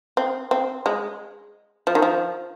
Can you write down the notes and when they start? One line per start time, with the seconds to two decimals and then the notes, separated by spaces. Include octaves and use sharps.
0.17 C4
0.51 C4
0.86 G#3
1.87 F3
1.95 D#3
2.02 F3